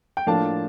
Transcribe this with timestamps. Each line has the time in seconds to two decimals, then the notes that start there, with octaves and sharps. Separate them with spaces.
0.17 G5
0.27 A2 F3 A#3 D4 F5 A5